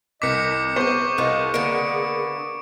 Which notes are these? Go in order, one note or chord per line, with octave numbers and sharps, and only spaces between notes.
C2 D#5 D6 B6 C#7
B3 G#4 C5 C#6 D6
C2 D#4 F4 F#4
D3 A#3 B3 D7